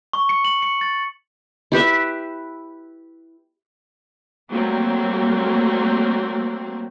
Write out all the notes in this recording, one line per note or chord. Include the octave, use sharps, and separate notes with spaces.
C#6
C#7
F#7
C#7
A6
E4 G4 B4 E5
F#3 G3 A3 A#3 C4